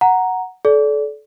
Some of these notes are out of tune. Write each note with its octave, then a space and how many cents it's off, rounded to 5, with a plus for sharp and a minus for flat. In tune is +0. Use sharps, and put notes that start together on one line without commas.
F#5 +0 A#5 +0
A4 -30 D5 -20